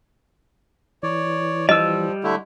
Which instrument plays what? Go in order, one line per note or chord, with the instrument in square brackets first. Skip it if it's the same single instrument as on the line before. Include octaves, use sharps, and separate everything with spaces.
[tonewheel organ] E3 [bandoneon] C#5 D5
[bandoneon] F3 [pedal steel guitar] G3 E6 [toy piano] D#5
[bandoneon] D3 A3 E4